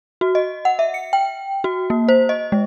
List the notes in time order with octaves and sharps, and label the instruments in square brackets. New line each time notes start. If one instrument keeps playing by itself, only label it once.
[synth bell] F#4
D#5
F#5
E5
C#7
G5
F#4
A#3
C5
D#5
G#3